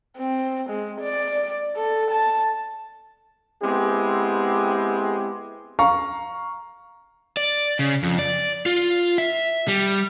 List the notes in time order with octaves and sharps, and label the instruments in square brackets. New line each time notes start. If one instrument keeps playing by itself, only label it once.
[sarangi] C4
G#3
D5
A4
A5
[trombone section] G#3 B3 C4 E4 G4
[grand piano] F5 A#5 C#6
[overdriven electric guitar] D5
C#3
F2
D5
F4
E5
G3